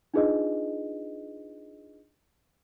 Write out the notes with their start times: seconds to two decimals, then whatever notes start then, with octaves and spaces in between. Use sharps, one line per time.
0.14 D4 D#4 F4 G#4 B4 D#5